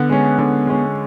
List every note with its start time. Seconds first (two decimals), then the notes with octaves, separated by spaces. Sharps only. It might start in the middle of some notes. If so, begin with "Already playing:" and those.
Already playing: D3 B3
0.09 G#3 C#4
0.38 D3
0.67 G#3 C#4